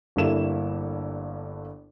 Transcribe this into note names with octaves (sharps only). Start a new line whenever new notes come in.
G1 G2 A#3 E4 A4 E7